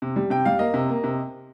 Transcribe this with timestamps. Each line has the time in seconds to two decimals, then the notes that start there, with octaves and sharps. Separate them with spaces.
0.02 C3
0.16 G3
0.30 C3 G5
0.45 G3 F5
0.59 A#3 D#5
0.74 C3
0.89 A#3
1.04 C3